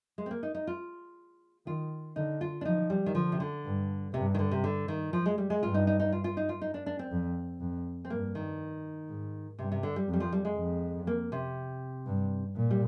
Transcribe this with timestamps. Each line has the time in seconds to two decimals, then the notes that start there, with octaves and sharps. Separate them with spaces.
0.18 G#3
0.26 C4
0.31 A#3
0.43 D#4
0.55 D#4
0.67 F4
1.66 D#3 F4
2.16 D3 D#4
2.41 F4
2.61 D4
2.65 F3 D#4
2.90 G3
3.06 D#3
3.15 D3 F3
3.32 C3
3.40 D3
3.65 G2
4.14 G2 C3
4.34 D#3
4.39 D3
4.51 C3
4.64 D3
4.88 D#3
5.13 F3
5.26 G#3
5.38 G3
5.50 G#3
5.62 G2 F4
5.74 D#4
5.87 D#4
6.00 D#4
6.12 F4
6.24 F4
6.37 D#4
6.49 F4
6.62 D#4
6.74 D4
6.86 D4
6.99 C4
7.11 F2
7.60 F2
8.05 C4
8.10 G2 A#3
8.35 D#3
9.09 G#2
9.59 G2 C3
9.72 C3
9.83 D3
9.96 G3
10.08 F2
10.13 G3
10.20 F3
10.33 G3
10.45 G#3
10.57 F2
11.07 A#3
11.32 C3
12.06 G2
12.56 A#2
12.71 G3